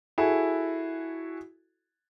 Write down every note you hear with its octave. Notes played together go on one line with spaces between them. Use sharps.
E4 F#4 G#4 A4